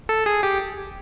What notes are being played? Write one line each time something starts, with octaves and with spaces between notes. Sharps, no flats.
A4
G#4
G4